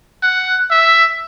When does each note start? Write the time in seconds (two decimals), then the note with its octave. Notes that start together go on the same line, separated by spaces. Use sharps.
0.23 F#5
0.71 E5